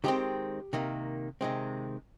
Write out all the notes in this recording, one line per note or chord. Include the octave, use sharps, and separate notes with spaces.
D#3 G#3 C4 G4
C3 D#3 A#3
C3 D#3 G#3 C4